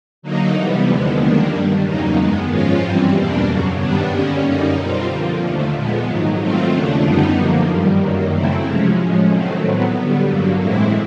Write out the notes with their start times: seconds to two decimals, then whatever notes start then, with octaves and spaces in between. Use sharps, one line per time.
0.22 D3 F#3 A#3 D#4
0.54 C3 E3 G3 B3
0.87 D#2 D3 F3 G#3 B3
1.19 D#3 G3 A#3 D4
1.52 G2 D#3 G3
1.84 E2 C#3 F#3 A#3 D#4
2.17 F#2 D#3 G#3 B3
2.49 G#2 F3 G#3 C#4 F4
2.81 G2 E3 G3 C4
3.14 E2 B2 G3 A#3 D4
3.46 F#2 C#3 F#3
3.78 G2 D#3 G3 B3 D4
4.11 D3 G3 A#3 C#4
4.44 F#2 D3 G3 A#3 D#4
4.76 B2 G3 C4 F4
5.09 D3 F3 A#3
5.41 D#2 D3 F3 A3
5.73 A#2 F3 G#3 B3
6.06 G#2 D#3 F#3
6.38 D#3 F#3 A3 C4 F4
6.70 D#2 C#3 F3 A3 D4
7.03 F#2 D3 G3 B3 D#4
7.35 F#2 D3 F3 A#3
7.68 G2 D#3 G3
8.00 F#2 D#3 F#3 A#3
8.33 C#3 F#3 A3 C4 E4
8.65 C3 F3 G#3 C#4
8.97 A2 F3 G#3 C#4
9.30 D#3 F#3 A3 C4
9.62 A2 F#3 B3
9.95 D3 G3 B3
10.27 G2 D3 F#3 A#3
10.59 A2 E3 G#3 C4 E4